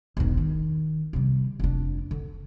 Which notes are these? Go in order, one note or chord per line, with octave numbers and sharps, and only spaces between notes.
E1 D#3
D#3
C3 G3
F1 D4
D3